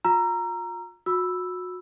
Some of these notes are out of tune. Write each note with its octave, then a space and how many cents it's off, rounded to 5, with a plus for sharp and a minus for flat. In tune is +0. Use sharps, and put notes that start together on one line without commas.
F4 +30 A#5 +0 E6 +40
F#4 -30 B5 +0 E6 +0